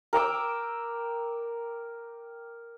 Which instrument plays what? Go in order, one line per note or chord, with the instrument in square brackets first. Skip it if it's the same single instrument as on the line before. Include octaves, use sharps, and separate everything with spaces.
[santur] A#4 G5 D6 E6